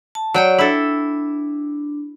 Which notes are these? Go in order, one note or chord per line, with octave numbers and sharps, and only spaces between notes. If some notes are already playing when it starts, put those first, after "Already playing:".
A5
F#3 C#5 D5 G5
D4 E4 A4